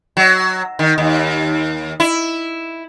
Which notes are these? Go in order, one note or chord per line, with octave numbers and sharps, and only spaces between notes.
F#3
D#3
D#2
E4